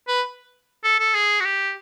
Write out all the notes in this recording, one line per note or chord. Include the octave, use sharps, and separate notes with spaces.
B4
A4
A4
G#4
F#4
G4